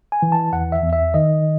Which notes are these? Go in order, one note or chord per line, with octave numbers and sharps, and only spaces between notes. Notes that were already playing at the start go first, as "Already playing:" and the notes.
G#5
E3
A5
E2 F#5
E5
E2
E5
D#3 D#5